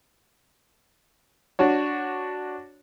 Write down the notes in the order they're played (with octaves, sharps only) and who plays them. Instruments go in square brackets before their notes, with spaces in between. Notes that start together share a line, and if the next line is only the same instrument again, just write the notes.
[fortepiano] D4 F#4 C#5